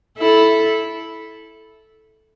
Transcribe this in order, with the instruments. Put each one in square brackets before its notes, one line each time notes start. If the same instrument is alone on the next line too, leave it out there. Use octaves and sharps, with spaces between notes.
[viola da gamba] E4 A4